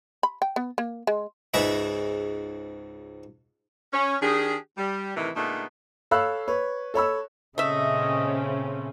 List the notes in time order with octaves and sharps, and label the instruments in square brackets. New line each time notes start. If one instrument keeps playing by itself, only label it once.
[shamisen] B5
G5
B3
A#3
G#3
[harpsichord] C#2 G#2 G#4 B4 D#5 E5
[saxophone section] C#4
D#3 D4 G4 G#4
G3
A2 C3 D#3 E3
A#2 D3 G#3 A3 B3 D#4
[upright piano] A4 C#5 F5 B5 E6 F#6
B4 C#5
A4 C#5 B5 E6
[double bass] A#2 C#3 [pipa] A3 E5 [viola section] C4 C#4 [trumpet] D#5